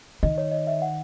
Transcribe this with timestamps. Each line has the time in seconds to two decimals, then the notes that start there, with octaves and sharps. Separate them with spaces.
0.23 D#3 D#5
0.38 C#5
0.52 D#5
0.67 E5
0.82 F#5